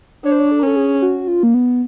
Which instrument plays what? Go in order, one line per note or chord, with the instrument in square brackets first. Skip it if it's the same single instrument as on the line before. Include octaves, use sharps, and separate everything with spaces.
[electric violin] D4 [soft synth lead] C#5
[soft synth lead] C5
C#5
A4
A#4
[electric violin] C#4 [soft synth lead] A4
[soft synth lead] G#4
F#4
F4
A#3
B3